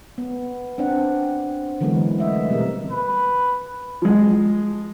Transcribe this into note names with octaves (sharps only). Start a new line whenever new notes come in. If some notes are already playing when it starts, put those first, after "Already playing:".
B3
C4 D4 F#5
D3 E3 F#3 G#3 B3 A#4
A3 C#4 D#5 E5
B2 G3 C4 A#4
B4
F3 G#3